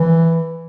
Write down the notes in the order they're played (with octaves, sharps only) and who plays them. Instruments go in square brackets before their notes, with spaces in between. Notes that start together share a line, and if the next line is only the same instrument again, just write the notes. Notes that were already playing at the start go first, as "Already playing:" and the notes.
Already playing: [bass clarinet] E3